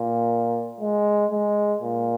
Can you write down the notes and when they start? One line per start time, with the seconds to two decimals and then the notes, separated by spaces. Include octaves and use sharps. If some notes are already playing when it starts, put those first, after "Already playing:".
Already playing: A#2
0.80 G#3
1.31 G#3
1.82 A#2